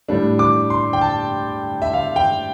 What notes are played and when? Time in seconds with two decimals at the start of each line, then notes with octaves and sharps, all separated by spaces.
0.08 A2 G3 D4
0.39 D6
0.70 C6
0.93 G5
1.01 A5
1.82 E5
1.93 F5
2.16 G5